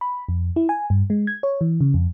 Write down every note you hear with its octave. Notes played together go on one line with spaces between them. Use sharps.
B5
F2
E4
G#5
G2
G#3
G#6
C#5
E3
C#3
F2